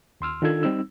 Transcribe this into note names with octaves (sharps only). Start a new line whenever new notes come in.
D#2 C6 E6 F6
D#3 D4 F4 A4 E6 G#6
G3 C4 D#4 E6